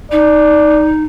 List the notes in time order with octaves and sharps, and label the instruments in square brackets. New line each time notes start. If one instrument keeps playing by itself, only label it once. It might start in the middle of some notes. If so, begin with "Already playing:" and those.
[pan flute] D#4 [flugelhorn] D5